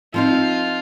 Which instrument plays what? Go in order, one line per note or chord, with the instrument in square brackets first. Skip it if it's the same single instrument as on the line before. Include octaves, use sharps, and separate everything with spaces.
[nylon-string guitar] F3 C4 D#4 [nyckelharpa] F4